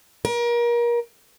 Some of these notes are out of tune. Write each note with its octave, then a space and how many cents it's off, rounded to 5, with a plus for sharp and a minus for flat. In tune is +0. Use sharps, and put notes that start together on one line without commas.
A#4 +30